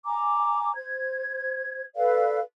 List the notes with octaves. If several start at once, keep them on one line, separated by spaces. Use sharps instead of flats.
G#5 A#5 D6
C5 G#6
A4 B4 D5 F5